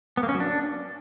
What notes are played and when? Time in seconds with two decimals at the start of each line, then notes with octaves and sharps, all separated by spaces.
0.17 B3
0.23 A#3
0.29 C#4
0.34 F#3
0.40 D4